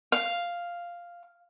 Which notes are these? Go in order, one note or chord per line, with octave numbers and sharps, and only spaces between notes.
F5